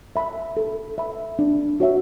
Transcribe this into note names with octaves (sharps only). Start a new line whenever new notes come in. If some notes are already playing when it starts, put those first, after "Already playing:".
E5 B5
A4
E5 B5
D4
F#4 C#5 E5